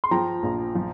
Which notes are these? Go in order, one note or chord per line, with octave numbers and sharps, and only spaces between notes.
C6
F3 G5 A#5
A#1
F3